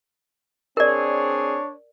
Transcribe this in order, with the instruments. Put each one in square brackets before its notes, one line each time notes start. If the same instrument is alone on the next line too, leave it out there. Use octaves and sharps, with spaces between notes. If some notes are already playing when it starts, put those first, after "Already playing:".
[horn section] C4 G#4 [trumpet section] D4 C#5 [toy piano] A#4 D5